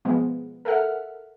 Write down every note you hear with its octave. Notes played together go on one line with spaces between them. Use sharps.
B2 F3 G#3 B3
A4 A#4 E5 F#5 F6